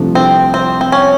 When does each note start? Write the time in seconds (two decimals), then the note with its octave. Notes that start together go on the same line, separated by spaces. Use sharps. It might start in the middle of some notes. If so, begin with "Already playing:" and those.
Already playing: C2 C3 F3 A3 D4
0.15 C4
0.54 C4
0.81 C4
0.92 C#4